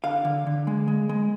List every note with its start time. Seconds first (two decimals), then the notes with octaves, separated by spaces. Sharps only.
0.04 D3 F5
0.25 D3
0.47 D3
0.67 G#3
0.88 G#3
1.09 G#3